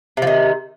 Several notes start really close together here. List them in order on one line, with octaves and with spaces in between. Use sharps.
C3 F3 D#3